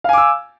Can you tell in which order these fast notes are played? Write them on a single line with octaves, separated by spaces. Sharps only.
F5 G#5 D6 E6